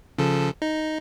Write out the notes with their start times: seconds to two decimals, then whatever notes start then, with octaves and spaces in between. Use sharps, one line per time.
0.18 C#3 F3 A4
0.62 D#4